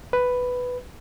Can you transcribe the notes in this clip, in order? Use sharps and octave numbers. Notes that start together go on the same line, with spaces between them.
B4